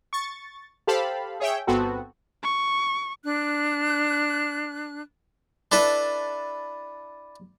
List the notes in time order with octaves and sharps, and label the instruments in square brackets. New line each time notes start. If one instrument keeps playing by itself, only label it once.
[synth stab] C#6 A6
G4 A4 C5 F5 A5 B5
G#4 C#5 E5 G5
G1 B3 C4 F#4 A4
[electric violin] C#6
[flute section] D4 F#6
[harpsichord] D4 E4 A4 B4